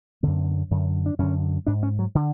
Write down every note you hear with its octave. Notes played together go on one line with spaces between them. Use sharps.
F#2 D3 B3
F#2 D3
D4
F#2 D3 C#4
G#2 D4
C#4
F#3
D3